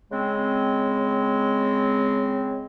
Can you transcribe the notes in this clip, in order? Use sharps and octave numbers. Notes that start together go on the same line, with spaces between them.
C#3 G#3 C4